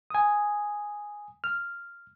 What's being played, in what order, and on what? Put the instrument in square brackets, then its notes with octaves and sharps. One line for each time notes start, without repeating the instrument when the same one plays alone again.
[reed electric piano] G#5 D#6
F6